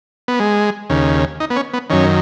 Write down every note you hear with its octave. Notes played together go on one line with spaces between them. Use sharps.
B3
G#3
D#2 C#3
D#4
B3
C#4
B3
F#2 D#3 C#4